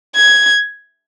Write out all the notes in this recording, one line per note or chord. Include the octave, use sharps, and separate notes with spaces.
G#6